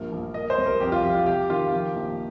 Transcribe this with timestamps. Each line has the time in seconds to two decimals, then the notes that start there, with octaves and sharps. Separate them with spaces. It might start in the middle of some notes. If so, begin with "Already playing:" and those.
Already playing: A#1 G2 A#4
0.12 A#1
0.34 A#3 D#5
0.50 C5
0.58 C2
0.66 A#4
0.80 F2 G4
0.92 F4
1.04 F3 G4
1.15 F4
1.26 C3 G4
1.49 D#3 F4
1.72 F3 G4
1.95 A#1